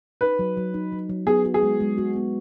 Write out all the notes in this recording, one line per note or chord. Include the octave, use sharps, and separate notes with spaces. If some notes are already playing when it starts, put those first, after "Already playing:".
D#4 B4
F#3
F#3
D#4
F#3
F#3
B3 G#4
F#4
G#4
G#3
G#3
F#4
B3